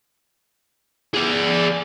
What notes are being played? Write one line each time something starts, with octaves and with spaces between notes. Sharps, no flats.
G#4 D5